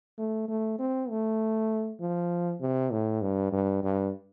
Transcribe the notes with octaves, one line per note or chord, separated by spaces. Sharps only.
A3
A3
C4
A3
F3
C3
A2
G2
G2
G2